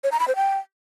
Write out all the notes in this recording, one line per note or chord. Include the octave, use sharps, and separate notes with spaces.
C#5
A#5
B5
C5
G5